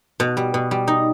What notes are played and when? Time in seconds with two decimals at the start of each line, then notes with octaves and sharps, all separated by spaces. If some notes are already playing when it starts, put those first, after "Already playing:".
0.20 B2
0.37 G3
0.54 B2
0.71 G3
0.88 D#4